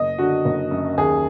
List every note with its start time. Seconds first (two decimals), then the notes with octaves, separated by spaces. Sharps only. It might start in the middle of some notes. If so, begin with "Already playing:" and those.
Already playing: F#1 D#5
0.18 D3 F#4
0.45 F#1
0.71 F#2
0.98 D#2 G#4